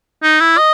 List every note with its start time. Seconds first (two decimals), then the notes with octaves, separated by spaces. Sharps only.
0.23 D#4
0.40 E4
0.57 D#5